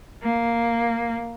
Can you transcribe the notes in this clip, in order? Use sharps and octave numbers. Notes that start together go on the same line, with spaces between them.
A#3